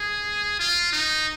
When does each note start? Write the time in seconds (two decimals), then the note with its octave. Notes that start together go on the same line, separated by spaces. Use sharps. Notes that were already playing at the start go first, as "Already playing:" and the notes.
Already playing: G#4
0.60 F4
0.93 D#4